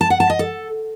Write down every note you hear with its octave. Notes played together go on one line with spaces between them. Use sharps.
A5
F#5
A5
D#5
A4